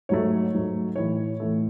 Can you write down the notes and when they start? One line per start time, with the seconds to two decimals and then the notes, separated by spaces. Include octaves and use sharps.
0.09 G#2 F#3 A3 C#5
0.54 G#2 F#3 A3
0.96 A2 E3 A3 C#5
1.40 A2 E3 A3